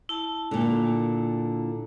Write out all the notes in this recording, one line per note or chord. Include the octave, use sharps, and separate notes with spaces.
E4 A5
A#2 D3